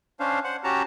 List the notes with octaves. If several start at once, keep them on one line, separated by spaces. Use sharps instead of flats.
C#4 D4 C5 F5
C5 F#5
C#4 F#4 G4 A5 A#5